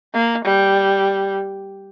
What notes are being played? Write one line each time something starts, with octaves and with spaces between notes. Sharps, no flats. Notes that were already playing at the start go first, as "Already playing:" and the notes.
A#3
G3